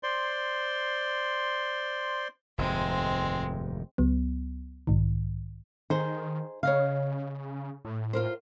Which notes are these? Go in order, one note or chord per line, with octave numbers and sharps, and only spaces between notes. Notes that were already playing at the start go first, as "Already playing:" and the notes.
C5 D5 C6
F1 D#2 G#2 G#3 C4
C#2 F#3 B3
B1 G#2 D#3
D#3 D#4 G#4 C5
C#3 C#5 D#5 F5
A2
F4 A#4 C5